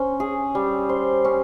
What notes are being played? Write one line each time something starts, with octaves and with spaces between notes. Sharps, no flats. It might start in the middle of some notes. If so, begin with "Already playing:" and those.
Already playing: C#4 C5
G#4
G3
C5
C#4